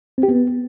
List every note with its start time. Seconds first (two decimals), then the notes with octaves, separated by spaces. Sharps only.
0.18 C4
0.23 G4
0.28 B3